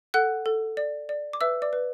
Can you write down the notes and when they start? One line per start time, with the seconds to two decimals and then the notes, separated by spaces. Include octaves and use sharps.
0.14 A4 F#5 F#6
0.46 A4
0.77 D5
1.09 D5
1.33 D6
1.41 B4 E5 E6
1.62 D5 D6
1.73 B4